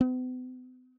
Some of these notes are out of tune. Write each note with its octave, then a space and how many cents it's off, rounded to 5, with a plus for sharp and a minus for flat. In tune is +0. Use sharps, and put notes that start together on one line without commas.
B3 +45